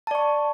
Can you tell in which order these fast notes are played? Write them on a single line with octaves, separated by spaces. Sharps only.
A5 D5 C#6